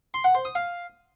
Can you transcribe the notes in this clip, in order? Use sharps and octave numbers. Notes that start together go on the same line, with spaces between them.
C6
F#5
C5
D#6
F5